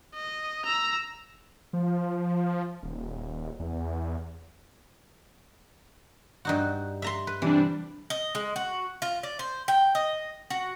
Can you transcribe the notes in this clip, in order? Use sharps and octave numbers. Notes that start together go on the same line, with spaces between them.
D#5
A#5 E6
F3
D#1
E2
G2 D#4 F#4
E5 A#5 C6
B4
C3 E3 G3 D4
D#5
G#3
F#4
F4
D5
C5
G5
D#5
F#4